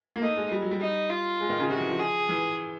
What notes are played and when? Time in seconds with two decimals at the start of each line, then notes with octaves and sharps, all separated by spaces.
0.16 A#3
0.22 A3 D#4
0.36 G#3
0.52 G3
0.61 F#3
0.71 G3
0.81 D#4
1.10 F4
1.40 G#3
1.49 D#3
1.60 C#3
1.69 C3 F#4
1.80 E3
1.89 F3
2.00 G#4
2.29 E3